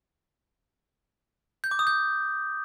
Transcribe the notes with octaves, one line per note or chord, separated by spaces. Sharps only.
G6
D6
D#6
G6